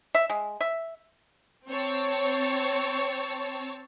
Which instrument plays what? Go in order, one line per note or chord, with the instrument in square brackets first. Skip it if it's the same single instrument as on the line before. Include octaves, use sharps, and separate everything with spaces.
[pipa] E5
G#3
E5
[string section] C4 C#5 A5